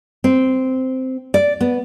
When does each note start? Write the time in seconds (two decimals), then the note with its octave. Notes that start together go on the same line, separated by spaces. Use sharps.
0.24 C4
1.34 D5
1.61 B3